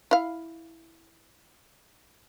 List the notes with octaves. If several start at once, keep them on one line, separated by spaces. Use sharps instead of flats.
E4 F5